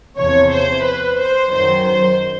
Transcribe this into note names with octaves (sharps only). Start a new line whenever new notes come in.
E2 C3 F3 C#5
C5
B4
C5
F#2 D#3 F#3 C5
C5